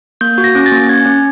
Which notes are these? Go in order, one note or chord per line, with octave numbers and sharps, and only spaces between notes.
A#3 G6
F#4
A#6
C#4
A6
A#3
C#4 G#6
C#4